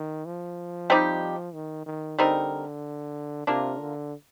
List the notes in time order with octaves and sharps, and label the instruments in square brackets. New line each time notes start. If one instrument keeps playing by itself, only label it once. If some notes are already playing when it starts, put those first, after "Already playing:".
Already playing: [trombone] D#3
F3
[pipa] G3 C4 D#4 G4
[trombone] D#3
D#3
[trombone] D3 [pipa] G3 C4 D#4 A#4
[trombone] C3 [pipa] A#3 D4 F4 A#4
[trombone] D3